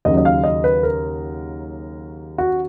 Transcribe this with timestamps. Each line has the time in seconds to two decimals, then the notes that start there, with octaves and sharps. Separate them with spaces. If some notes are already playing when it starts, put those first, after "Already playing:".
0.05 D#2 C#3 F#3 D#5
0.17 D#5
0.25 F5
0.44 D#5
0.64 B4
0.83 A#4
2.38 F#4